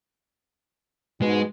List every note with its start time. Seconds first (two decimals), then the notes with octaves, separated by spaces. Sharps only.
1.22 G#2 B2 G#3